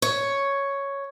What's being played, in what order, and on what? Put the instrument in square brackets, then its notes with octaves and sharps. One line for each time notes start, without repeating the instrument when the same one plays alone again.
[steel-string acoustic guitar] C#5